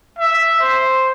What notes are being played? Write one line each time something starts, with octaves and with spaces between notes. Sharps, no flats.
E5
C5